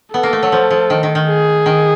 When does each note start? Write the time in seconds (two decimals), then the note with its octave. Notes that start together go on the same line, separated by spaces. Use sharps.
0.13 B3 A4
0.23 A#3
0.33 A3
0.43 F#3
0.52 F3
0.70 F3
0.90 D#3
1.03 D#3
1.15 D#3
1.28 G#4
1.66 D#3